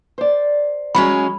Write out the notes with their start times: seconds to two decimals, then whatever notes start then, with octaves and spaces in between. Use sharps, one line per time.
0.18 C5 D5
0.95 F#3 G#3 C#4 B5